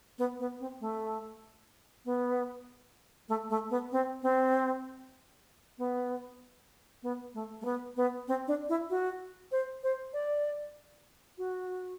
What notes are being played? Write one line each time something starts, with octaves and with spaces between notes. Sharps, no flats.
B3
B3
C4
A3
B3
A3
A3
B3
C4
C4
B3
B3
A3
A3
B3
B3
C4
D4
E4
F#4
C5
C5
D5
F#4